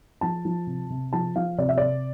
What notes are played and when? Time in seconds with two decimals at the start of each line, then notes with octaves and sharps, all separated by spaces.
0.21 F3 A5
0.45 F3
0.67 C3
0.90 C3
1.13 F3 A5
1.36 F3 F5
1.58 C3 D5
1.69 E5
1.78 C3 D5